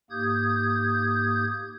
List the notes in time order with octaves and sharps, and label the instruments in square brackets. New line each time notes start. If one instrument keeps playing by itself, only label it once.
[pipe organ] G#2 A#3 G4 D#6 G6 G#6